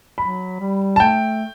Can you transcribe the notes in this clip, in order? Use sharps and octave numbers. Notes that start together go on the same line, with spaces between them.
F#3 B5
G3
A5
A3 G5